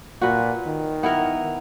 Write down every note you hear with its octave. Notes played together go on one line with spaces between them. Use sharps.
A#2 F#4 B4
D#3
B3 E4 A#4